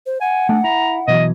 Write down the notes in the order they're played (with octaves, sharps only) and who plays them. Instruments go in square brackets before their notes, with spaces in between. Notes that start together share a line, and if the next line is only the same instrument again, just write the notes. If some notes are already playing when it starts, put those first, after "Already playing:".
[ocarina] C5
[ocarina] F#5 [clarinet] G#5
[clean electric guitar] A3 G5 G#5 [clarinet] D4
[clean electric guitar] E4 [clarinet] A#5
[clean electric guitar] B2 E3 F#3 [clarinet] D#5